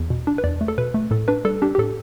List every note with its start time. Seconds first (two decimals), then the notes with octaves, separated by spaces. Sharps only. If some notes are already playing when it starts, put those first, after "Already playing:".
Already playing: E2
0.10 B2
0.27 D4
0.38 B4
0.44 E2 D5
0.61 A3
0.68 A4
0.78 B2 B4
0.94 A3
1.11 A2 A4
1.28 D4 B4
1.45 G3 A4
1.62 D4 G4
1.75 G4
1.78 A2 A4